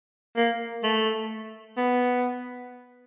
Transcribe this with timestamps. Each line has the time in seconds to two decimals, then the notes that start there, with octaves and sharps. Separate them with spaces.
0.37 A#3
0.83 A3
1.77 B3